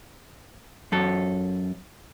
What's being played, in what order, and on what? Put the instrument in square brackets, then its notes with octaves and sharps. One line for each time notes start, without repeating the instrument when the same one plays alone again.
[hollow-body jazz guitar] F#2 A4